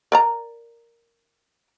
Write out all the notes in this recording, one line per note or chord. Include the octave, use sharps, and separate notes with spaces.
A#4 D5 A#5